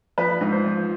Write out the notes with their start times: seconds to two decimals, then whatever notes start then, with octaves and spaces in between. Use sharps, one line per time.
0.18 F3 B4
0.41 G#2
0.52 C5
0.64 F3